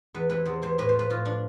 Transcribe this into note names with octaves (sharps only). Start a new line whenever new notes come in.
E2 B4
C3 E3 B4
E2 C5
C3 E3 C5
A2 B4
F3 C5
B4
A2 F4
F3 D4